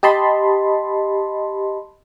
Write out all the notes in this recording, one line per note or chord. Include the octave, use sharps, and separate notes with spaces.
G4 D#5 A5 B5 C6